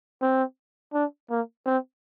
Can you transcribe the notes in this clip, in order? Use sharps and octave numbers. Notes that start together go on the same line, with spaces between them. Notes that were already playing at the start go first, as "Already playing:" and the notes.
C4
D4
A#3
C4